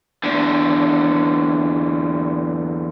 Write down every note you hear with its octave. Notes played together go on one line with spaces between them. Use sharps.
E2 D3